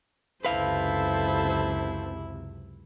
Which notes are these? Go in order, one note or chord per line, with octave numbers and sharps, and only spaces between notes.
C#2 F#2 C3 E4 A4 B4 C5 F5